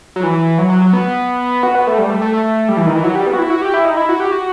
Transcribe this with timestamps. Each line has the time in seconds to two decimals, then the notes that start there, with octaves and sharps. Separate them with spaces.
0.16 F#3
0.23 E3
0.58 F#3
0.70 F#3
0.82 F#3
0.93 B3
1.63 F#4
1.75 B3
1.87 A3
1.98 G3
2.10 A3
2.22 A3
2.33 A3
2.69 G3
2.77 E3
2.86 D#3
2.95 E3
3.04 F#3
3.15 G3
3.27 B3
3.33 F#4
3.39 E4
3.50 F#4
3.62 G4
3.74 E4
3.85 D#4
3.97 E4
4.09 F#4
4.20 G4
4.31 F#4